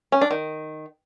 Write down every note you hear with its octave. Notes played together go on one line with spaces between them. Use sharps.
C#4
D4
D#3